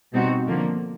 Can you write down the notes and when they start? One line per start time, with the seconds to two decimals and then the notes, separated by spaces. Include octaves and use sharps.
0.14 B2 G3 C4 D#4 F#4
0.48 D3 F3 A#3